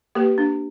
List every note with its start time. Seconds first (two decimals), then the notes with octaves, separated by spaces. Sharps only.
0.15 A#3 G4 B4
0.38 D4